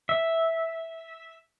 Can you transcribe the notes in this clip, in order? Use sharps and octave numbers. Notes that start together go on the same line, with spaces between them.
E5